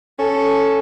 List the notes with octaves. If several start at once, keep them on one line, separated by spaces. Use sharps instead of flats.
C#4 A4